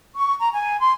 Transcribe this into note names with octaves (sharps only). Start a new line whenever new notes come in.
C#6
A#5
G#5
C6